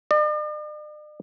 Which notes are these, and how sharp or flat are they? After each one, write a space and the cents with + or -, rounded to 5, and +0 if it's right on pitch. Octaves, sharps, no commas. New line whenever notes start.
D5 +45